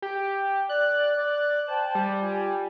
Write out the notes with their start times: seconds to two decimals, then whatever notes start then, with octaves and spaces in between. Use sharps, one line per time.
0.02 G4
0.69 D5 F#6
1.17 D5
1.68 C5 G5 A5
1.95 G3
2.22 F4 G4 G#5